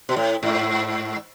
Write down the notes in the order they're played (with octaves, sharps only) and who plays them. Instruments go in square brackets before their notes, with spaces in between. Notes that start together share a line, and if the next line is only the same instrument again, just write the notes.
[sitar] B2
A2
G#2